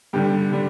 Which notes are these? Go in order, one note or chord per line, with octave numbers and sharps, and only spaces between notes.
G2 D3 G3 G4
D3 G3